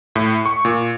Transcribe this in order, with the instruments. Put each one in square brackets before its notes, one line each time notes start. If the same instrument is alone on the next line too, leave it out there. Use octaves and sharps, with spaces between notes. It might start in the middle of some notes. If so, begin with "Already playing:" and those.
[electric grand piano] A2
C#6
A#2